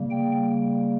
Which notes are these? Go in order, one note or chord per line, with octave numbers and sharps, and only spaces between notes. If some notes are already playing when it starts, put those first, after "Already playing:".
Already playing: C#3 G3 A#3
G5